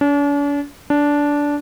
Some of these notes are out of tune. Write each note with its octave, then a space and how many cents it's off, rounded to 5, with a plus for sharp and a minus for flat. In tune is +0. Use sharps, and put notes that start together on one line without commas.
D4 -45
D4 -15